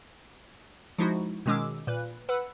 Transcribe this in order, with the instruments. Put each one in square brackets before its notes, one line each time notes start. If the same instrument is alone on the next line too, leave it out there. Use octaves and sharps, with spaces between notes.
[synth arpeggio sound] F3 G#3 D#4 E4 F#4
B2 D#3 G#3 C#4 D6 E6
A#2 B4 F#6
B4 F#5 B5 E6